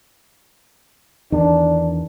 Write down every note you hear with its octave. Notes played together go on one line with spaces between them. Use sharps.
E2 D#3 D4